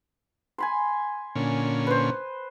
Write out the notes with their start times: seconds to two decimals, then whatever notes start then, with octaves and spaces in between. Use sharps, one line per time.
0.58 G#5 B5 C6
1.35 A#2 D3 C#4
1.87 B4 C5